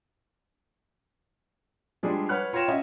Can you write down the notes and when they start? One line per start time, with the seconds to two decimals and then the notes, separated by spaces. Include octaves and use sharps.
2.03 F3 G3 G#3 D4 G#4 D5
2.29 B4 C#5 F#5 F6 F#6
2.53 F4 C#5 G5 A#6 E7
2.68 C#4 D#5 E5 F#5 G#5